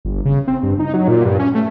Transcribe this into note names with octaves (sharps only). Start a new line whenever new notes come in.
G1
C#3
C4
G2
D#4
F#3
A#2
G2
C#4
A3